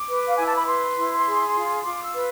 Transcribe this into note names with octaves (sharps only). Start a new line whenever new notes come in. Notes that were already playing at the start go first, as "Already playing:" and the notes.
Already playing: D6
B4
F5
E4 G#5
A5
B5
B4 C6
E4
G#4
F4
F4 D6
E6
B4